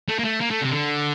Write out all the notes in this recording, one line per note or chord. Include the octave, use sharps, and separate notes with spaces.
A3
A#3
A3
A#3
A3
C3
D3